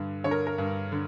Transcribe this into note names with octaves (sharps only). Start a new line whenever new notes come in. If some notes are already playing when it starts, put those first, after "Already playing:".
Already playing: G2 D3
D3 C#5
A#4
A#4
G2
D3